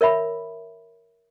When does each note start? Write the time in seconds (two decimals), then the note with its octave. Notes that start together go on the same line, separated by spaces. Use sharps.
0.01 A#4 C#5 E5 B5